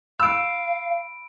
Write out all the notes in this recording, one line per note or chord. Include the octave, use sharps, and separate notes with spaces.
F5 B5 E6 D7